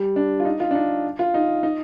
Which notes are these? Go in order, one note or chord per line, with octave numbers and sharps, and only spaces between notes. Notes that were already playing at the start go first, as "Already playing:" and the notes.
Already playing: G3
D4
F4
D#4
F4
D4
D#4
F4
D#4
D#4